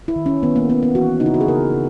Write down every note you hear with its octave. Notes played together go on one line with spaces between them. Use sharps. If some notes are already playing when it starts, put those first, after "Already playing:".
E4
D#3
C#4
D#3 B3
A#3
A#3 B3
B3
E3 F#4
C#3 D#4
E4
F#4
G#4
C#3 A#4
C#3